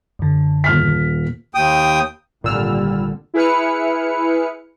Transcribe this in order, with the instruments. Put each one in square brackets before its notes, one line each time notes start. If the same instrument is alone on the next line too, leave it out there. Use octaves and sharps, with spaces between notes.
[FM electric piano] F#2 D3
[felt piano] D#1 F6 B6
[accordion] D#2 G5 D#6
[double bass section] G#1 D3 G3 [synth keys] A#2 E6 F6
[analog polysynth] E4 G#4 B4 F6 C#7